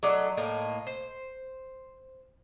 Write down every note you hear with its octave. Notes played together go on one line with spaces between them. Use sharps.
F#3 A3 D4 D#5
A2 A#3 D#4
C5